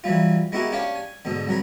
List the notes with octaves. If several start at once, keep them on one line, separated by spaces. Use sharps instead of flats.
E3 F#3 G3 F4
G#3 B3 E4 F#4 G4 A#4
C#4 D4 G4 C#5 F5
G#5
G#2 B2 D3
C2 F#3 A#4 B5